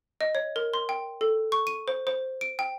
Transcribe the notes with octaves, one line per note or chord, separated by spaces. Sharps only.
D#5
C#5
A#4
C6
G5
A4
C#6
D#7
C5
C5
D7
G5